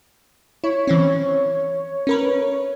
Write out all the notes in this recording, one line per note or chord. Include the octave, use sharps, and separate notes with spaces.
E4 C#5
E3 C4 C#4
C#4 A#4 B4